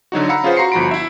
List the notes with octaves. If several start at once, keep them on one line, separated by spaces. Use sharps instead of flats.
D3 F#3 D#4 F#4
F5 F#5 A#5 B5 E6 C#7
C#4 F4 G#4 B4 C5 F5
F#4 A#5 C6 C7 C#7
G1 F3 F#4 A#5 B5 D7
E4 E5